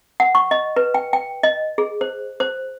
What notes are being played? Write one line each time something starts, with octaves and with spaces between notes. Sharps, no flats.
F#5
C#6
D#5
B4
G5
G5
D#5
G#4
C5
C5